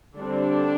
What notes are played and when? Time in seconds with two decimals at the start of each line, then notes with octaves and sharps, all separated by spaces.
0.18 D3 G3 C4 D4